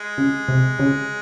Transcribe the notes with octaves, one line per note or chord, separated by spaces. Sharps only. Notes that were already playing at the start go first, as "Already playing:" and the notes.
Already playing: G#3
C#3
C3
C#3